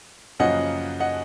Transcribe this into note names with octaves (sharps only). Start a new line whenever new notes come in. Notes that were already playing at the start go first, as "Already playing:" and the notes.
F#2 C#3 F3 A#3 D#5 F#5
D#5 F#5